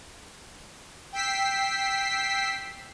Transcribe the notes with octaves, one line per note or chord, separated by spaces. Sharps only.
G5 E6 B6 C7